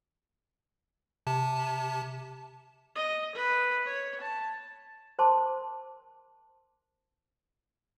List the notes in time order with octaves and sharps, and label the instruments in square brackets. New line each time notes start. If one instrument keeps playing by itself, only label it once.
[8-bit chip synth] C3 A5
[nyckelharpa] D#5
B4
C#5
A5
[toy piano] A#4 C5 A5 C6 D6